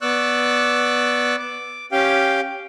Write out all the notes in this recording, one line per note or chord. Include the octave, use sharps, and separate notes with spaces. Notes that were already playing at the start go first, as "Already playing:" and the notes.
B3 D5 C#6 E6 F#6
D6
C#4 G4 F5 G5